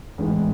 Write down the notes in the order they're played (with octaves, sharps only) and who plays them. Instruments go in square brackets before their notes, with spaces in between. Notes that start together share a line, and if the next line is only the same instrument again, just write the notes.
[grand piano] A1 G#2 E3 G#3 B3